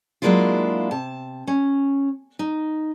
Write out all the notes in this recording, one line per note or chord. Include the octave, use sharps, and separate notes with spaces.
F#3 G#3 A#3 D4 E4 F4
C3 A5
C#4
D#4